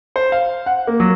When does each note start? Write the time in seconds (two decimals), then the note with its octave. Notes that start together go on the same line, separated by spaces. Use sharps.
0.16 C5
0.32 F5
0.66 F#5
0.87 A#3
1.00 F#3